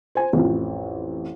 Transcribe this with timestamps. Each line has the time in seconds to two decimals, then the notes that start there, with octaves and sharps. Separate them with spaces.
0.15 C5 G#5
0.33 A1 F2